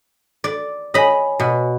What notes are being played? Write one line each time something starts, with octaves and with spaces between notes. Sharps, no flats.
D5
C#5 D#5 G#5 B5
B2